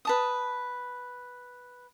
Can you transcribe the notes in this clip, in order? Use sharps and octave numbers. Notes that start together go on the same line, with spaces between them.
B4 A5 D#6